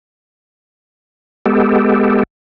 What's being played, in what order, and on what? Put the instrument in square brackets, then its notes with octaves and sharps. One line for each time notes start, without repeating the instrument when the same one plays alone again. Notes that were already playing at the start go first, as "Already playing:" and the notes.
[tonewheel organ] G#3 B3 G4 A4